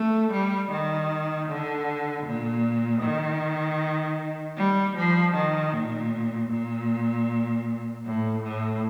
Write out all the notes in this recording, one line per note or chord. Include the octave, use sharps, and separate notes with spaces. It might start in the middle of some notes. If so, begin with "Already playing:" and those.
Already playing: A3
G3
D#3
D3
A#2
D#3
G3
F3
D#3
A#2
A#2
A2
A2